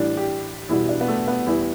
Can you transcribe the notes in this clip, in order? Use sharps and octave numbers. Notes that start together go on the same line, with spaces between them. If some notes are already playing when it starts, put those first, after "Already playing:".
Already playing: A2 E3 G3 D4
G4
E2 B2 G3 E4
D4
B3
A3
B3
E2 E3 G3 E4